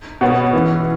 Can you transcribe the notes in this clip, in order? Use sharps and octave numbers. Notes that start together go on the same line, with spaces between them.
B2 B3 C#5 F#5
E3 C#4